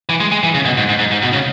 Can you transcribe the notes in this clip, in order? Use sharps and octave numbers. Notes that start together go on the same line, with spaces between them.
E3
G#3
G#3
E3
C#3
B2
G#2
G#2
G#2
G#2
B2
C#3